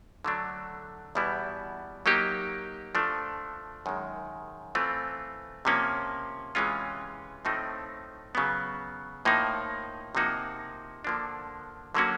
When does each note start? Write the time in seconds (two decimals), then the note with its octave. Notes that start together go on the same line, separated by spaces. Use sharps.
0.25 D3 F#3 A3 D4
1.15 E2 B2 G3 B3 E4
2.06 F#3 A#3 D#4 G4
2.95 F3 A3 D4
3.86 F#2 D#3 G#3
4.75 E3 A3 C4 F4
5.65 C3 F3 A#3 C#4
6.55 C3 E3 G#3 C#4 F4
7.45 A2 F3 A3 C4 D#4
8.35 C#3 F#3 B3
9.25 A2 F3 A#3 D#4
10.15 C3 F3 A#3 D#4 F#4
11.05 D3 F3 A#3 D4
11.95 D3 F#3 A#3 C#4 F#4